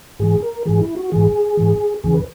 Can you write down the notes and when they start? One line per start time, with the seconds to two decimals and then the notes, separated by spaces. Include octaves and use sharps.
0.20 G#2 E3 G#4
0.42 A#4
0.66 G#2 E3 G#4
0.81 E4
0.96 F#4
1.12 G#2 E3 G#4
1.57 G#2 E3
2.04 E2 C#3 E3 G#4
2.14 B4